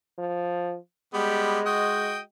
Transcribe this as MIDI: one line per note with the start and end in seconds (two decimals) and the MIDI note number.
0.18 0.77 53
1.14 1.60 55
1.14 2.21 56
1.14 1.60 59
1.14 1.60 67
1.66 2.19 66
1.66 2.19 75
1.66 2.19 79